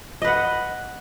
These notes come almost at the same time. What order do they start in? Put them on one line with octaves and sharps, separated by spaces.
D#5 B4 F#5